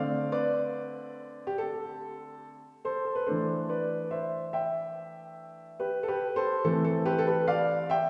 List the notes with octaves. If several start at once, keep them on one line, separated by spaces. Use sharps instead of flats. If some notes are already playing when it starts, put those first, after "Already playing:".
Already playing: D3 A3 C4 D5 F5
B4 D5
G4
A4
A4 C5
A4
B4
E3 A3 D4 A4 C5
B4 D5
C5 E5
E5 G5
G4 B4
A4
G4 B4
A4 C5
E3 A3 C4 A4
A4
G4 B4
A4
G4 B4
D5 F5
E5 G5